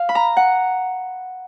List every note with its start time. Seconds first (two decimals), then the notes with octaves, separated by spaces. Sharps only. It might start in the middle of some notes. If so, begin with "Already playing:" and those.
Already playing: F5
0.09 B5
0.15 A#5
0.37 F#5